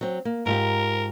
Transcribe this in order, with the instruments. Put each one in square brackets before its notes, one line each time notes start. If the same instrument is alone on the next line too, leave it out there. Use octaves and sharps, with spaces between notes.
[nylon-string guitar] F#3 C4
A#3
[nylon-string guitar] G#2 F4 G4 [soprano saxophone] A#4